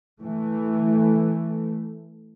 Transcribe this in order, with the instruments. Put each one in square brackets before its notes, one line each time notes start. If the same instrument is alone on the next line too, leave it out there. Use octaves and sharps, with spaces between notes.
[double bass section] E3 A3